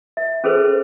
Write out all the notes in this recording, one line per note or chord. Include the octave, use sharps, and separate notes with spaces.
E5
C#4 G#4 A4 B4 C5